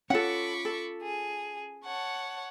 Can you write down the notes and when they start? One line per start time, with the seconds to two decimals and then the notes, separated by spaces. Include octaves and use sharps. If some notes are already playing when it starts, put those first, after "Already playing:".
0.10 C#4 F4 A4 F#5 B5 C#6 D6
0.65 A4
1.01 G#4
1.84 C#5 F#5 A5